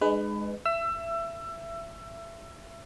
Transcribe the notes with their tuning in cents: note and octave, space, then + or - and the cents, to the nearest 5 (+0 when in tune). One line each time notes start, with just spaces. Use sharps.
G#3 +5 D#4 -40 B4 +20
E5 +25 E6 +25